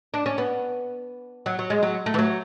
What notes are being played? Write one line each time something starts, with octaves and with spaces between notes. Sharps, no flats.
D4
C#4
B3
F#3
F#3
G#3
F#3
A3
E3
F#3